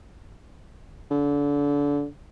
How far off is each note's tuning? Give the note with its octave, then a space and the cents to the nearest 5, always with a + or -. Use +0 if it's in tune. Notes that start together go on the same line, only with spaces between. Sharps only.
D3 -30